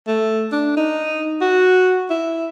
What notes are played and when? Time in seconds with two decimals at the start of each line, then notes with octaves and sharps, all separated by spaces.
0.07 A3
0.52 D4
0.77 D#4
1.41 F#4
2.10 E4